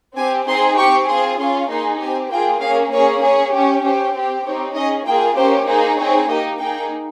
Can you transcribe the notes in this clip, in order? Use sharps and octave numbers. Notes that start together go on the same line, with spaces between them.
C4 G4 G#5
C4 D#4 G#4 C6
C4 G4 C#6
C4 F4 G#4 C6
C#4 F4 G#4 C6
A#3 D#4 G#4 C6
C4 G4 G#5
A#3 F4 G#4 G5
A#3 C#4 G#4 F5
A#3 C#4 G#4 C#5
C#4 G#4 C#5
C#4 G4
C#4 G4 C5
C4 G4
C4 D#4 G4 C#5
C#4 G#4 D#5
A#3 F4 G#4 G5
A#3 C#4 G4 C5
A#3 D#4 G#4 C5
C4 D#4 G#4 C#5
A#3 D#4 G4 D#5
A#3 D#4 G#4 G5